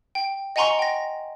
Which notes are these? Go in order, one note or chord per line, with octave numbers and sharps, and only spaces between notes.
G5
D#5 F#5 G#5 A#5 C6 C#6
G5 A#6